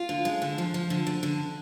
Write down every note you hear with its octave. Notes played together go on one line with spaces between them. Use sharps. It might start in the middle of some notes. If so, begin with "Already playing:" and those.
Already playing: F4
D3
G#3
D3
F3
F3
D3
D3
D3